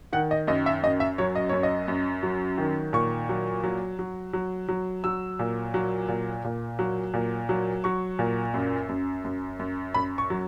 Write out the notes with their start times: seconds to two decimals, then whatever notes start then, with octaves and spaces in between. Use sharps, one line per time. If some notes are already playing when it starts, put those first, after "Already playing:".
0.13 D#3 F#5
0.31 D#5
0.48 F#2 D#5
0.66 E5
0.83 F#2 D#5
1.00 E5
1.18 F#3 C#5
1.36 D#5
1.49 F#2 C#5
1.63 D#5
1.88 F#2
2.23 F#3
2.58 D#3
2.93 A#2 C#6
3.29 F#3
3.63 F#3
3.99 F#3
4.33 F#3
4.68 F#3
5.04 F#3 E6
5.39 A#2
5.74 F#3
6.08 A#2
6.44 A#2
6.79 F#3
7.14 A#2
7.49 F#3
7.84 F#3 C#6
8.19 A#2
8.54 F#2
8.89 F#2
9.25 F#2
9.59 F#2
9.94 F#2 B5
10.18 C#6
10.30 F#3